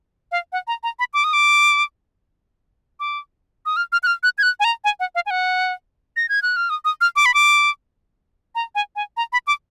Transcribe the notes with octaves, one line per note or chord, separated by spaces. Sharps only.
F5
F#5
A#5
A#5
B5
D6
D#6
D6
D6
D#6
F6
F6
F#6
F6
F#6
G#6
F#6
G#5
A#5
G#5
F#5
F5
G#5
F#5
A#6
G#6
F#6
F6
D#6
D#6
F6
D6
B5
D6
A#5
G#5
G#5
A#5
B5
D6